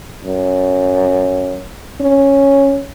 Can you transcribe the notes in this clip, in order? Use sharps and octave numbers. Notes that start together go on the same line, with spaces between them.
F#2
C#4